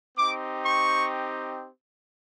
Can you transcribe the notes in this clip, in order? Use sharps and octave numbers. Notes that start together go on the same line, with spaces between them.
C4 D#4 G4 D6
C#6